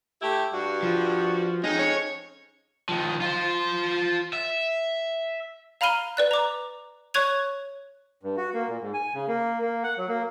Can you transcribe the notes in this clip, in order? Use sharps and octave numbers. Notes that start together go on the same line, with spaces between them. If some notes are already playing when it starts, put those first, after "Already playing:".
A3 E4 G4
G2 F#4
F3
F2 G#3 C#4 D#4
C#5
D#3 F3
F4 C5
E5
F5 A#5 B5 F6 D#7 G7
B4 D5 F#6
A#5 D6
C#5 C#6 F#6 G#6 F7
G2
F#4
A#3
A#2
G#2
G#5
C#3
A#3
A#3
F#5
F#3
A#3